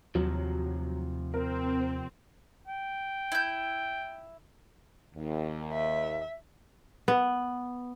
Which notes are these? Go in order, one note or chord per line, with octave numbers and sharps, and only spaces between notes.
D#2 C3 F3 F#3
C4 A#4
G5
E4 G6
D#2
E5
B3